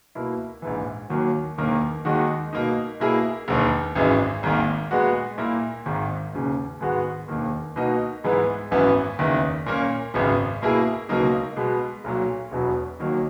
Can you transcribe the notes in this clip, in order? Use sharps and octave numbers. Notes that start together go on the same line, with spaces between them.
B2 A#3 E4
A#1 G#2 E3
D#2 D#3 F#3 A#3
E1 D#2 D#3 A#3
D#2 D#3 G#3 D#4 F#4
B2 A#3 D#4
B2 A#3 E4 G#4
E1 D#2 D#3
G#1 F#2 E3 G#3 D#4
G#1 G#2 D#3 A#3
A#2 G#3 B3 F#4
A#2 A#3 E4
G#1 G#2 D#3
E1 D#2 C#3
G#2 D#3 G#3 B3 F#4
E1 D#2 D#3 A#3
B2 A#3 D#4 F#4
G#2 E3 G#3 B3 E4
G#1 F#2 E3 B3
F#1 E2 D#3
A#2 A#3 C#4
G#1 F#2 C#3 G#3 B3
B2 A#3 E4 G#4
C#2 B2 F#3 A#3 D#4
B2 G#3 B3
B1 A#2 F#3
E1 E2 B2 F#3 B3
D#2 D#3 F#3 A#3 D#4